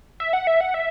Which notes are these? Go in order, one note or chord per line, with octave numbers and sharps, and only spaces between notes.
E5
F#5
E5
F#5
E5